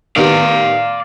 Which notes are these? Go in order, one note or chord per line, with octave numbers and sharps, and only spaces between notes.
D#3 B3 G4 D5 F5